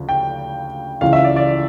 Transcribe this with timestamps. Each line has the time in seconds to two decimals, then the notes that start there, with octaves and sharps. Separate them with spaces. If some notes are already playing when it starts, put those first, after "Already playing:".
Already playing: D2 C#3 F3
0.09 G5
1.01 C#2 C#3 E3 F5
1.13 E5
1.24 D5
1.36 D5